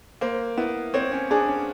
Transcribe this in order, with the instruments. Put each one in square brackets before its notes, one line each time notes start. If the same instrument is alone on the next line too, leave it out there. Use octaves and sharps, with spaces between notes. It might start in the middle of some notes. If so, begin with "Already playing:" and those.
[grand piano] A#3 [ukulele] C5
[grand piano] B3 [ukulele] E4
[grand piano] C4 [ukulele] C#5
[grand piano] C#4
[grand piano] D4 [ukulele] G#4
[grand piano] C#4